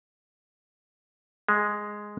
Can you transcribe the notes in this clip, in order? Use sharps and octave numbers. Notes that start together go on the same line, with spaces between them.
G#3